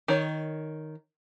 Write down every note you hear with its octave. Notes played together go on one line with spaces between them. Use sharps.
D#3 C#5